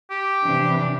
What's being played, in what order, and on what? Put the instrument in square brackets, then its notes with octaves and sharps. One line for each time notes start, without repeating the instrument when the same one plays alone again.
[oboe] G4
[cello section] C3 E3 D4